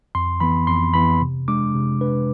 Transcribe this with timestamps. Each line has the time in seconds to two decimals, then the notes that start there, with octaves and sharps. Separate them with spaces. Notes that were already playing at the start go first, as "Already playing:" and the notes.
0.15 F2 C6
0.40 E3 B3 B5
0.67 F2 C6
0.94 E3 B3 B5
1.21 C3
1.48 G#3 D4 D6
1.75 C3
2.01 G#3 D4 B4